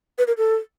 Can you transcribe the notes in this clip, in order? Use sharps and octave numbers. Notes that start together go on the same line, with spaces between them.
B4
A#4
A4